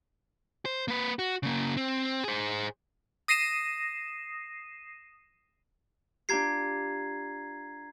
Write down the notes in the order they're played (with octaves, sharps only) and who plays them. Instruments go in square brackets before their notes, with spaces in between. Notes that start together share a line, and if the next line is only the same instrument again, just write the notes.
[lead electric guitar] C5
A#3 B4
F#4
C#3 A#3
C4
G#4 C5
[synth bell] D#6 A#6 C7 D#7 E7
[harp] D4 F4 G4 [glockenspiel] A#5 G#6 C7